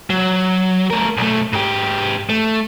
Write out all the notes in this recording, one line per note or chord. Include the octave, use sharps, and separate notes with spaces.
F#3
A3 A#4
B1 A3
G#2 G4
A3